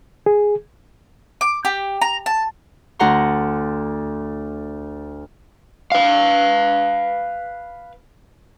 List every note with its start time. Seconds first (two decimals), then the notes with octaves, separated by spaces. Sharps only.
0.26 G#4
1.41 D6
1.65 G4
2.01 A#5
2.26 A5
2.99 D2 F#4 F#5 A#5 C6
5.92 B4 F5